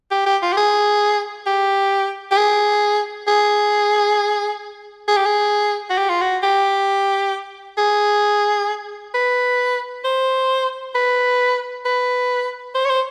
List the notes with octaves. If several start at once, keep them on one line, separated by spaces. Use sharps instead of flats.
G4
G4
F4
G4
G#4
G4
G4
G#4
G#4
G#4
G4
G#4
F#4
G4
F4
F#4
G4
G#4
B4
C5
B4
B4
C5
C#5
C5